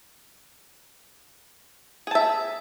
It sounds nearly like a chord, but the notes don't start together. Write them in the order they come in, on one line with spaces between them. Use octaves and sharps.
G#4 A5 E5